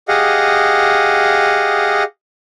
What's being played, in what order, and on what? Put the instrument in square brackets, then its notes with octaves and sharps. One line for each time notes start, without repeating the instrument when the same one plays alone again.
[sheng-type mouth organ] G4 G#4 D#5 F5 F#5